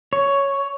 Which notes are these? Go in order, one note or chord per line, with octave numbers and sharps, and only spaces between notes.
C#5